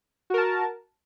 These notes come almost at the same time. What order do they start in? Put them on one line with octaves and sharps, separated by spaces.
F#4 A#4 A5